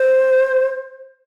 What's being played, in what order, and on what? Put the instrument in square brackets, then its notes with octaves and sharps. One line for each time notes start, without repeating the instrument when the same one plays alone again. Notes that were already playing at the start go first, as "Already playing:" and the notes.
Already playing: [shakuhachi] C5